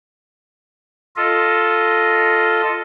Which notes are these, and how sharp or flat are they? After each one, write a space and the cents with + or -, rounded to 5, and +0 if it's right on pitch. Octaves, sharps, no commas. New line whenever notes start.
F4 +0 A4 +0 D#5 +0